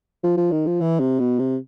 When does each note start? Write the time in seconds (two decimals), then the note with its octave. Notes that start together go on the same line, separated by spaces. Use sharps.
0.24 F3
0.37 F3
0.51 D#3
0.67 F3
0.81 E3
1.00 C3
1.19 B2
1.39 C3